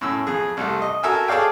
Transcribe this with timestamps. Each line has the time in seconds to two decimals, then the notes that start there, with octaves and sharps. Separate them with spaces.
0.01 F#2 A2 E6
0.27 F2 G#4
0.57 C2 G3 A3 F#5
0.82 D#5
1.03 F#4 A4 A#4 E5 G#5 E6
1.28 G#4 A4 C#5 D5 F5 G5